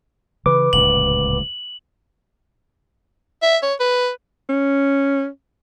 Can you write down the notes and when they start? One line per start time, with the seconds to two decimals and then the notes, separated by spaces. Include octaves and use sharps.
0.46 C#3 E3 B4 D6
0.73 D1 C#2 A#2 F#7
3.43 E5
3.63 C#5
3.80 B4
4.49 C#4